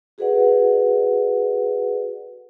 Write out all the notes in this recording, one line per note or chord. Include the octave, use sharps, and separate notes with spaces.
F#4 G#4 A4 B4 D5 F#5